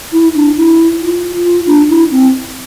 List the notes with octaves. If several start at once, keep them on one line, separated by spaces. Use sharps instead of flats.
E4
D4
E4
F4
F4
D4
E4
C4